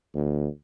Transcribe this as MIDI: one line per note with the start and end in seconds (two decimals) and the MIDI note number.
0.15 0.48 38